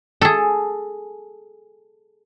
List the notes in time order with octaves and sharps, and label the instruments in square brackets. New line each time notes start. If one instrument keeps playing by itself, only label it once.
[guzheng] G#4 A4